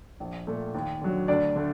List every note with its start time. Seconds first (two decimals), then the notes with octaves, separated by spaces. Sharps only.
0.20 A#1
0.47 A#2 A3
0.75 D#2
1.01 D3 F#3
1.28 D2 D4 D5
1.56 D3 A3